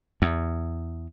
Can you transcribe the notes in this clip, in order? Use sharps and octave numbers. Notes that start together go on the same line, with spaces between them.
E2